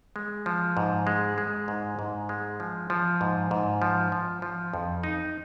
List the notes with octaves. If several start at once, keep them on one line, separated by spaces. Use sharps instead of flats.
G#3
F3
G#2
G#3
G#3
G#2
G#2
G#3
F3
F3
G#2
G#2
F3
F3
F3
F2
D#4